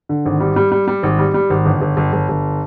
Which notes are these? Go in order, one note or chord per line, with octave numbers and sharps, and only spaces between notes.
D3
G#1
G3
G3
G3
G3
G#1
G3
G3
G#1
G1
G1
G1
G1
G1